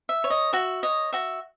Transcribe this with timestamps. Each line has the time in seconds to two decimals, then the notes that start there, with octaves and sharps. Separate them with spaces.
0.09 E5
0.24 C#5
0.30 D#5
0.53 F#4 E5
0.83 C#5 D#5
1.13 F#4 E5